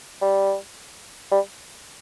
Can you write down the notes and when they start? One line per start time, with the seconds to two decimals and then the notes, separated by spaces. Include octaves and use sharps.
0.22 G3
1.31 G3